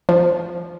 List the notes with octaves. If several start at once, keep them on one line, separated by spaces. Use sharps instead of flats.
F3